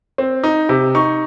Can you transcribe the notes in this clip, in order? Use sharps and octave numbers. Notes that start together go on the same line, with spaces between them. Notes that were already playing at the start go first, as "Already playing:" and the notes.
C4
D#4
C3
D#4 C#6